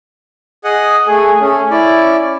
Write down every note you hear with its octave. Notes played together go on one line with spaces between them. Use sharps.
G#4 D#5 F#5
A3 G#4
A3 C#4
E4 D5